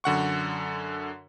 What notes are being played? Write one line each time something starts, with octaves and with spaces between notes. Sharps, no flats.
F#2 D3 F#5 C#6